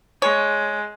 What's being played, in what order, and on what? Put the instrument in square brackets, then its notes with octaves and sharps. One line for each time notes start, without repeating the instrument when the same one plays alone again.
[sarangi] G#3 [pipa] C#5